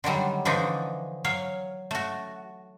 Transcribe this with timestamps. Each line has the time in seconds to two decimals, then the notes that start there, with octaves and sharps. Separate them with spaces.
0.04 D3 D#3 F#3 G3
0.45 D3 E3 F3 A3 D4 D#4
1.24 F#3 C#5 F5
1.91 A3 F#4